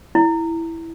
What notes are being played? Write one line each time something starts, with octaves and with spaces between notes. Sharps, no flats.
E4